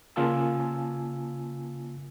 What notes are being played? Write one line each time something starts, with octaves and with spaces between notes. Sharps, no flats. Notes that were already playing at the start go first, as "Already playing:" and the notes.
C#3 A#3 F4 G#5 A5 E6